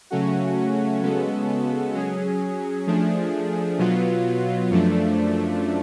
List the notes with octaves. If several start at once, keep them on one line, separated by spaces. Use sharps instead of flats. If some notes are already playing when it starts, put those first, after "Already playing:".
C#3 F#3 A3 C#4 F#4
C#3 G#3 B3 F#4 A4
F#3 C#4 G#4
F3 A3 D4 G#4
B2 F#3 B3 F4
F#2 F3 A3 D4